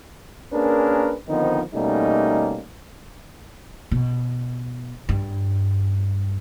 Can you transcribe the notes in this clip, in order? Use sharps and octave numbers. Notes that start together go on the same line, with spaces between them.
A#3 C#4 D4 G#4 A#4 B4
D3 D#3 F3 B3 C4 D#4
B2 G3 A3 A#3 C#4 D#4
B2
G2